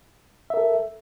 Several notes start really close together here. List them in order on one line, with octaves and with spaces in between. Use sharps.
E5 A#4 A4